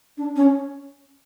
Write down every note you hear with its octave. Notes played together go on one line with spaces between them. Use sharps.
D4
C#4